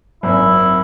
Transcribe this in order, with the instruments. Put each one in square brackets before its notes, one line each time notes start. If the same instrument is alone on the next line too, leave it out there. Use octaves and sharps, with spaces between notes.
[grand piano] G#1 F#2 C4 [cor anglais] E4